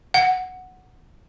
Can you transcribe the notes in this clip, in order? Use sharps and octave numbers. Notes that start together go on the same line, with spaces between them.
F#5